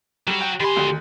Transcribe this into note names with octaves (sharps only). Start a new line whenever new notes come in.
F#3 G3 F#4
G5
D#3 G4 G#5 B5 C6
G#1 D2